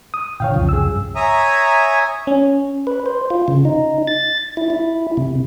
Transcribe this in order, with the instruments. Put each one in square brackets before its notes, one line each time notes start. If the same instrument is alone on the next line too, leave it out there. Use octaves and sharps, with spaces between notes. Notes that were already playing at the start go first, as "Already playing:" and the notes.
[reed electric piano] D#6
[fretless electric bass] A#2 D3 [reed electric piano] C#5 F5 G5
[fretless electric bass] C2 F2 C#3 [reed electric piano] F3
[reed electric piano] G#4 E6
[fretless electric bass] G2
[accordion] C#5 E5 G#5 A#5 D#6
[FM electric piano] C#4
[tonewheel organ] B4
C5
F4
C#3
D#4
A6
E4
E4
C3